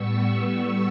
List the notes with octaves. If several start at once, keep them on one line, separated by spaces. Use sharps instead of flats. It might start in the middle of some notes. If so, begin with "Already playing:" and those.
Already playing: A2 G3 B3 C#6 E6
C#6 E6